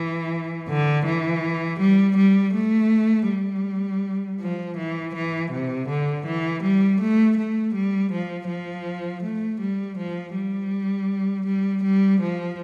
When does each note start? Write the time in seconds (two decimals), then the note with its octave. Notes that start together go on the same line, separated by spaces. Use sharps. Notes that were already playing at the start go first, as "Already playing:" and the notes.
Already playing: E3
0.69 D3
1.05 E3
1.79 G3
2.17 G3
2.54 A3
3.29 G3
4.40 F3
4.77 E3
5.15 E3
5.51 C3
5.89 D3
6.25 E3
6.63 G3
7.01 A3
7.37 A3
7.74 G3
8.12 F3
8.48 F3
9.23 A3
9.60 G3
9.97 F3
10.35 G3
11.46 G3
11.83 G3
12.20 F3